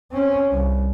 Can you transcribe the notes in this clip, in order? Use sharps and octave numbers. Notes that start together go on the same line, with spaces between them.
C4 C#4
C2